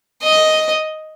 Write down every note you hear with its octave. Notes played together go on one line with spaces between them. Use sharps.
D#5